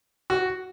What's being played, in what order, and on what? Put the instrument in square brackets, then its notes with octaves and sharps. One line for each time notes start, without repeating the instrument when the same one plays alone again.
[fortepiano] F#4